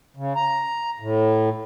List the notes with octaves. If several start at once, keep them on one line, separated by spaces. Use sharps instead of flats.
C#3
A#5
A2